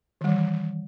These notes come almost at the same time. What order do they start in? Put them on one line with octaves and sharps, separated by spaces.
D#3 G3 E3